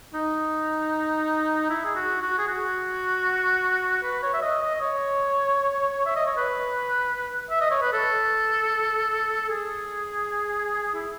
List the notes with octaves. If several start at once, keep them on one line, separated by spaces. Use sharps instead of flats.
D#4
E4
G#4
F#4
F#4
G#4
F#4
B4
C#5
E5
D#5
D#5
C#5
E5
D#5
C#5
B4
E5
D#5
C#5
B4
A4
G#4
E4